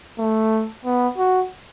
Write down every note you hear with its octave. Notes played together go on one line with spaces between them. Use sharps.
A3
B3
F#4